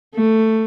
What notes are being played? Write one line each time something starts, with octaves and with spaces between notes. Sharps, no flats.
A3